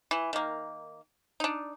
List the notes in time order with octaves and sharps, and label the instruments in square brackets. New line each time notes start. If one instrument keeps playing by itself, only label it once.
[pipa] E3
D#3 A#3
D4 D#4